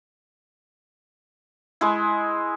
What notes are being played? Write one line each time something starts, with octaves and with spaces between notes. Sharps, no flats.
G#3 E4